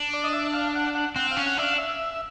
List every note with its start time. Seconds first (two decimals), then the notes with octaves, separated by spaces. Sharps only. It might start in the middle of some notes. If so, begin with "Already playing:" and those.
Already playing: D4
0.14 D5
0.24 D#5
0.33 E5
0.54 F5
0.75 F#5
0.95 F#5
1.16 C4 F#5
1.31 F5
1.37 C#4
1.46 F#5
1.57 D4 E5
1.63 F5
1.78 E5